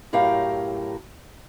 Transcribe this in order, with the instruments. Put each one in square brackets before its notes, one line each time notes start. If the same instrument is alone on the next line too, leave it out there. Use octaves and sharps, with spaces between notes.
[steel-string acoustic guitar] F#2 A2 G4 A#4 F5